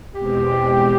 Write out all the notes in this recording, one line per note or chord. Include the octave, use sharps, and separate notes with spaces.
E2 B2 G#3 C4 G4